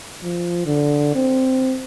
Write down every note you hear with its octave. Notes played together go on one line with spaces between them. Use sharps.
F3
D3
C4